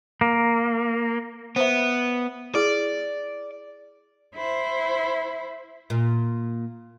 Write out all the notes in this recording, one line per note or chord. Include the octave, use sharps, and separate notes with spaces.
A#3
B3 C5 E5
E4 G#4 D5
E4 C5
A#2